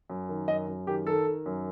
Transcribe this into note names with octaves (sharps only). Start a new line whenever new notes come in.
F#2
D#3
F#2 D#5
F#2
D#3 G4
D#3 A4
D#3
F#2